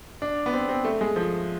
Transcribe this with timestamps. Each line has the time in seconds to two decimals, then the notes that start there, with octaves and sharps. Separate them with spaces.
0.22 D4
0.46 B3
0.53 C4
0.69 C4
0.84 A3
1.01 G#3
1.16 F3